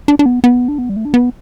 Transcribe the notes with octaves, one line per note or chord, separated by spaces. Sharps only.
D4
D4
B3
B3
D4
B3
G3
A3
D4
B3